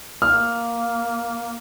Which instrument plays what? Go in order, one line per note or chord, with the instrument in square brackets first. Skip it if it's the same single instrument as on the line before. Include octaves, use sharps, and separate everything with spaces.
[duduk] A#3 [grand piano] F6